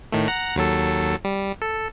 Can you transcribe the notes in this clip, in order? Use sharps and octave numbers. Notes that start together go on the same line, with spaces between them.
A2 D#3 A3
F#5 A#5
D#2 F#3 A4
G3
A4